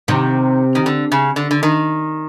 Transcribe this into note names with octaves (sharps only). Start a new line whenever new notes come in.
C3 D#3
D#3
D3
C#3
D3
D3
D#3